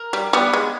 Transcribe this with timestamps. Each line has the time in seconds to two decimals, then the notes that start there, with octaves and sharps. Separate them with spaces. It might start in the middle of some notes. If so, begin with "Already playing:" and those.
Already playing: A#4
0.13 G3
0.33 G3 B3
0.53 G#3